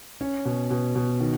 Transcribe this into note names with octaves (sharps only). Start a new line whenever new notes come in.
C#4
B2
B2
B2
D#3